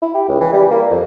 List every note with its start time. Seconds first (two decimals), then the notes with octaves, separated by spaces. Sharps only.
0.02 E4
0.15 G4
0.29 C#2
0.41 E3
0.53 G3
0.71 A#3
0.90 F2